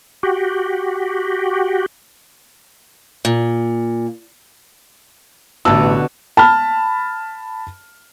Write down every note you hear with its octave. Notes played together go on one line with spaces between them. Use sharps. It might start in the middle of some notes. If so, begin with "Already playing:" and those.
F#4 G4
A#2
A1 B2 D3 A5 E6
A5 B5 F6